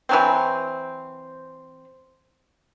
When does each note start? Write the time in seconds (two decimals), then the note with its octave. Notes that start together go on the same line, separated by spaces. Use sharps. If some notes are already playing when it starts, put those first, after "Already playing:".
0.09 E3 F#3 C4